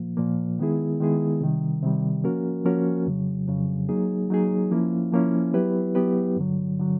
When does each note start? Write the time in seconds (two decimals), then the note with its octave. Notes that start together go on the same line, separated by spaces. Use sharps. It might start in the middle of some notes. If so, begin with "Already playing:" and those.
Already playing: A#2 F3 A#3
0.17 A#2 F3 A#3
0.59 D#3 G#3 B3 E4 G#4
1.00 D#3 G#3 B3 E4 G#4
1.41 C3 D#3 G3
1.83 C3 D#3 G3
2.24 F3 A#3 C#4 F#4 A#4
2.65 F3 A#3 C#4 F#4 A#4
3.06 F2 C#3 F#3
3.47 F2 C#3 F#3
3.89 F#3 A#3 D#4 G#4
4.30 F#3 A#3 D#4 G#4
4.71 F3 A#3 C#4 E4
5.12 F3 A#3 C#4 E4
5.54 F#3 B3 E4 G4 B4
5.95 F#3 B3 E4 G4 B4
6.36 G2 D3 F#3
6.79 D3 F#3